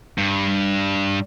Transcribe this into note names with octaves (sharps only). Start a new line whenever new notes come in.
G2